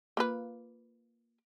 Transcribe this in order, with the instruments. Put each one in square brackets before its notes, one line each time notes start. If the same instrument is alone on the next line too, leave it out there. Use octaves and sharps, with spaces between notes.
[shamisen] A#3 F4 B4